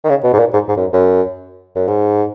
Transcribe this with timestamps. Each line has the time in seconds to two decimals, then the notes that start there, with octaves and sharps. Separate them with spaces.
0.04 D#3
0.09 C#3
0.24 B2
0.33 G#2
0.39 A#2
0.53 G#2
0.68 G#2
0.77 F#2
0.93 F#2
1.76 F#2
1.87 G#2